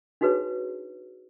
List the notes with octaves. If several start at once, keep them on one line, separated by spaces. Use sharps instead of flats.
D4 D#4 F#4 G#4 B4 C#5